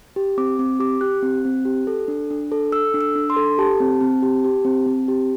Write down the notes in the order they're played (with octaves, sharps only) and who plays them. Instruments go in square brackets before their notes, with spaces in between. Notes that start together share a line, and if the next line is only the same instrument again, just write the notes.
[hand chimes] G4
C4 D6
C4 D6
G4 D6
G4 F#6
C4
C4
G4
A4
D4
D4
A4
A4 E6
D4
E6
D4
C6
A4
G4 A5
C4
C4
G4
G4
C4
C4
G4